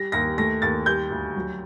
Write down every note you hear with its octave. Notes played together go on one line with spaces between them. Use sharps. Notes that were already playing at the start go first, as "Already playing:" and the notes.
Already playing: G3 A#6
D#2 A#6
A3 A#6
D#2 A6
G3 G6
D2
F#3